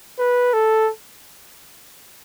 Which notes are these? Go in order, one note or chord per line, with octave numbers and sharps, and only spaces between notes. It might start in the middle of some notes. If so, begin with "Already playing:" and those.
B4
A4